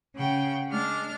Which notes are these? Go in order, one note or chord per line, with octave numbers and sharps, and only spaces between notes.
C#3 F#5 G5
G#3 D4 D6 F6